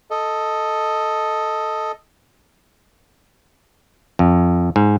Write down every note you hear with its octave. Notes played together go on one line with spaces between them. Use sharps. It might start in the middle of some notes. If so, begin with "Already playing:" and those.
A4 D#5
F2
G#2